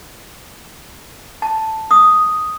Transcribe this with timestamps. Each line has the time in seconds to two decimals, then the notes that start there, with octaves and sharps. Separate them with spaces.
1.42 A5
1.91 D#6